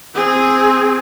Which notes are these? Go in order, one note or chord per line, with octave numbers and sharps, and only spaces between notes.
C4 G#4